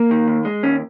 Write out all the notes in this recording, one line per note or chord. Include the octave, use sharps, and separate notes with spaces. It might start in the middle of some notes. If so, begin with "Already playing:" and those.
Already playing: A#3
D#3
D#2
G#3
D#2 C#4